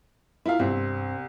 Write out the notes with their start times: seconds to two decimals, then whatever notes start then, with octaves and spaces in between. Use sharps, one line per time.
0.46 E4 F4 A#4 F5
0.59 C2 G2 C4